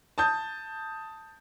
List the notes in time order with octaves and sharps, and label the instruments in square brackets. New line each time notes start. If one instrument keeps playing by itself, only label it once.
[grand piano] A5 D#6 G6